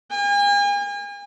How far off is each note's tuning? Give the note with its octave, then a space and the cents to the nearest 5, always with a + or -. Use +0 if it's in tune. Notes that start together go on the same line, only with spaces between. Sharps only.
G#5 -40